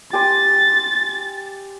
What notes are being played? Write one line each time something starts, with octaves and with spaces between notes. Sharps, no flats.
G4 G#5 C6 A6